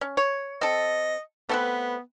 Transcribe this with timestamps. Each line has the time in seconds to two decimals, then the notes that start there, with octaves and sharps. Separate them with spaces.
0.01 C#4
0.17 C#5
0.61 C4 A4 D#5
1.49 A3 B3 C4 B4